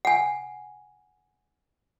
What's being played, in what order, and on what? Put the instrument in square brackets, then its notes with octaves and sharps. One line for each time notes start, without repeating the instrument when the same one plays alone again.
[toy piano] F#5 G#5